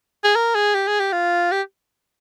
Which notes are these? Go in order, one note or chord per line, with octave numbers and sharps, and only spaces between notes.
G#4
A#4
G#4
G4
G#4
G4
F4
G4